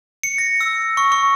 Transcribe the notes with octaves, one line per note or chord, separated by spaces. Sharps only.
C#7
A#6
E6
C#6
C#6